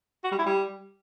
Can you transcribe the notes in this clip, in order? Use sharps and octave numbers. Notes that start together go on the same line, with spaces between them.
F#4
G3
E4
G3